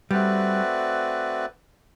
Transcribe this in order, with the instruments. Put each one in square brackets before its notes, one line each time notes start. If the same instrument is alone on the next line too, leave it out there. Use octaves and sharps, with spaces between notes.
[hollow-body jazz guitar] G3 [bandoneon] A3 C4 F#4 B4 D5